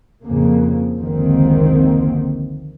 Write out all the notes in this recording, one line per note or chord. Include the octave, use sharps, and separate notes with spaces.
F2 C#3 A#3
F1 C#2 D3 D#3 A#3 C4